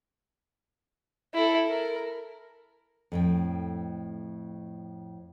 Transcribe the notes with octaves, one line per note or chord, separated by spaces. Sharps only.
E4 A4
A#4
F2 A2 G5